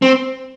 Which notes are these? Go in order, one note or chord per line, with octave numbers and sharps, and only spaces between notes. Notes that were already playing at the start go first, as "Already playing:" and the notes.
C4